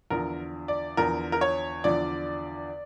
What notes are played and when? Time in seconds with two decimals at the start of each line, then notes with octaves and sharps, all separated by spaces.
0.10 E2 D3 F3 A#4
0.68 D5
0.97 E2 D3 F3 A#4
1.32 A#4
1.41 C#5
1.84 E2 D3 F3 D5